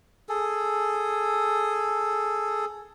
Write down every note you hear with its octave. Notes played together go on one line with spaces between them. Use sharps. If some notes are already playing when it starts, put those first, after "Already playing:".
G#4 A4